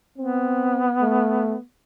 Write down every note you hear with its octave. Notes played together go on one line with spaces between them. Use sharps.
B3 C4
A3